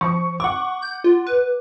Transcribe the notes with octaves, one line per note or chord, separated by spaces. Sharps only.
F3 C#6
F#5 C#6 D6
G6
F4
B4